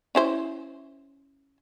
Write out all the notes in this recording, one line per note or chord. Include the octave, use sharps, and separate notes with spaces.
C#4 E4 C5